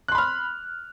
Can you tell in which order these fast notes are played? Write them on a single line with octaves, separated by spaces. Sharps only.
F#6 C6 B5 F6